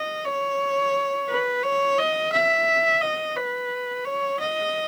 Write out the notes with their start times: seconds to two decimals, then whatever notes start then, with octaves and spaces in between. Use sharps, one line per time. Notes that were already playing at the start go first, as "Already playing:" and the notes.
Already playing: D#5
0.25 C#5
1.28 B4
1.63 C#5
1.98 D#5
2.33 E5
3.01 D#5
3.36 B4
4.05 C#5
4.40 D#5